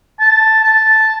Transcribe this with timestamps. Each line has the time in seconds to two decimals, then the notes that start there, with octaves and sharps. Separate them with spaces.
0.20 A5
0.64 A5